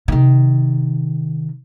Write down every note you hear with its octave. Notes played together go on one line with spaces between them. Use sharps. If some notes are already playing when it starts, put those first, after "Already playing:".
C3 D#3